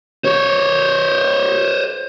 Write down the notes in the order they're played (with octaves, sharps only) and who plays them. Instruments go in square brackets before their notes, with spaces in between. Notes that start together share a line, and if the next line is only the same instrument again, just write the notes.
[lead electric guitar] C5 C#5